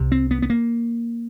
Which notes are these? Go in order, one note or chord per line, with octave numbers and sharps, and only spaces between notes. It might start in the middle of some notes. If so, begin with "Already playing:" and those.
Already playing: C2 C3
C4
B3
B3
A#3